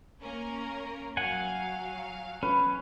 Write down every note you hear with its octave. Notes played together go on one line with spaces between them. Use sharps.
A#3 C#4 A#4
F#3 F5 F#5 G#5
C#4 B4